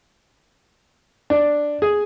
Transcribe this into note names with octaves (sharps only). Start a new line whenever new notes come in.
D4
G#4